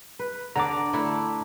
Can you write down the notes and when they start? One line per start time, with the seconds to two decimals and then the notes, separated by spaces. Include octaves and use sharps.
0.19 B4
0.56 D3 D5 A#5 D6
0.93 A3 D4 E4